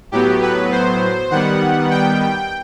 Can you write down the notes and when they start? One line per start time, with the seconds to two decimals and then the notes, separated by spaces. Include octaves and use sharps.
0.12 A2 F#3 B3 G4
0.42 B4
0.72 C5
1.31 D#3 G3 B3 F#5
1.90 G5